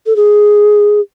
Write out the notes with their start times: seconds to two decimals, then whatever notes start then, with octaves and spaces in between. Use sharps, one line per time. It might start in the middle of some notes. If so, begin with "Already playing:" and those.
0.06 A4
0.16 G#4